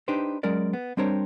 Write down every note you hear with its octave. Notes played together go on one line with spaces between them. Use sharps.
D4 D#4 G4 B4 C5
F#3 G#3 C#4 A#4 D5
B3
G3 C4 D4 A#4 C5 C#5